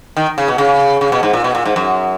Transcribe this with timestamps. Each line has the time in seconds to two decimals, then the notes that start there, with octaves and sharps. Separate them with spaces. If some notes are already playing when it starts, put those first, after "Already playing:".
0.17 D#3
0.38 C#3
0.48 B2
0.58 C#3
1.01 C#3
1.12 B2
1.23 G#2
1.33 A#2
1.44 B2
1.55 A#2
1.66 G#2
1.76 F#2